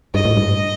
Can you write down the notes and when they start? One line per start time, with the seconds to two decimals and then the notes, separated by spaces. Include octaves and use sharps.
0.14 G2 D#5
0.25 A2
0.37 G2